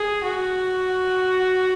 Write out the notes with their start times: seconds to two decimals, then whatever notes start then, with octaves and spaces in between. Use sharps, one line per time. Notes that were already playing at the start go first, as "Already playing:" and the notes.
Already playing: G#4
0.24 F#4